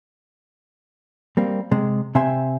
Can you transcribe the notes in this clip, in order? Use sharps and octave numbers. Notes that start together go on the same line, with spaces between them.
G3 A#3 C4
C3 G#3
C3 C4 E5 G#5 C6